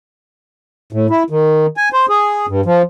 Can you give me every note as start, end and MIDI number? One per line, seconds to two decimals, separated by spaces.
0.93 1.07 45
1.10 1.23 64
1.30 1.66 51
1.77 1.89 80
1.93 2.06 72
2.09 2.46 68
2.48 2.61 43
2.66 2.82 53